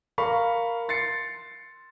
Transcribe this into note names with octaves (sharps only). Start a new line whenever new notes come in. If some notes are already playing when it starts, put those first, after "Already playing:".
A#4 F5 B5 C#6
C6 A6 C7 C#7